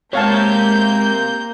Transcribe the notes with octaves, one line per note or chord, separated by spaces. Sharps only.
G#3 A#3 C4 G4 C#5 F5 A5 G6